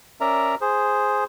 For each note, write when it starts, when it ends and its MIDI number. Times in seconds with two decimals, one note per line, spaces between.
0.21 0.55 61
0.21 0.55 70
0.21 0.55 74
0.21 0.55 76
0.21 0.55 82
0.61 1.24 68
0.61 1.24 72